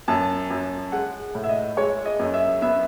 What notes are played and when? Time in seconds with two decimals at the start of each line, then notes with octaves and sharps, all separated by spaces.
0.08 F#2 A5
0.50 F#2
0.92 G#3 F#5
1.35 A2
1.43 E5
1.49 D#5
1.77 G#3 C#5
2.05 D#5
2.19 F#2
2.34 E5
2.62 B3 E5